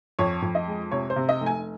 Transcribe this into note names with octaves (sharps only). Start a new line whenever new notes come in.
F2 C#5
F2
D#5
G#3
C3 C#5
C5
C3
D#5
F1
G#5